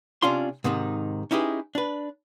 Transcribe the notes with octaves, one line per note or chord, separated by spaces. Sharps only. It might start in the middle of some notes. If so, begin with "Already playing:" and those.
C3 C#4 D4 F4 C6
G#2 C3 D#3 D#4
C#4 D#4 E4 G4 G#4 B4
D4 B4